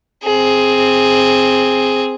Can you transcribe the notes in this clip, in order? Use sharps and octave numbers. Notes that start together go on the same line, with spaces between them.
C4 G#4